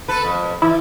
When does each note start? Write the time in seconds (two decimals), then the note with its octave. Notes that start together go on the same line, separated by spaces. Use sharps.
0.08 A4 B4
0.25 F2
0.62 E3 E4